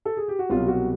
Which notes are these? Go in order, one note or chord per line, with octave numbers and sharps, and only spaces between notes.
A4
G#4
G4
F#4
C2 B2 F#3 F4
F#4